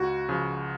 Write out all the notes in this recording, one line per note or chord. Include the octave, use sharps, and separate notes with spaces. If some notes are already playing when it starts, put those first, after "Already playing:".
Already playing: C#2 F#4
C#3 F3